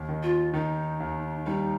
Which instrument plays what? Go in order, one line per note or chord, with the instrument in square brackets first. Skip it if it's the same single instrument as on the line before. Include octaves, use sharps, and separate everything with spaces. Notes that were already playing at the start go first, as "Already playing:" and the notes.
Already playing: [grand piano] D#2
D#3
[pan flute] F4
[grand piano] D#3 [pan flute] D#4
[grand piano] D#2
[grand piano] G3 [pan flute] D#4